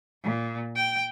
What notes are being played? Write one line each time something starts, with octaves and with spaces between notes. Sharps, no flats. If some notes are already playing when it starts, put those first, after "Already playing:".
A#2
G5